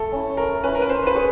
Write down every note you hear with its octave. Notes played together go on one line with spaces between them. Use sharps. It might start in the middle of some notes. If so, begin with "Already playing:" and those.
Already playing: A3 A4
C#4 E4
A3 A#4
C#4 E4 B4
A#4
B4
C#4 C5
B4
G#4 C#5